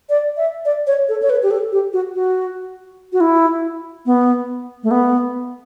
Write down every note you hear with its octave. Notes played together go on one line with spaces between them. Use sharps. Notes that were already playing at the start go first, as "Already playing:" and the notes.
D5
E5
D5
C#5
A4
C#5
B4
G4
A4
G4
F#4
F#4
F#4
E4
B3
A3
B3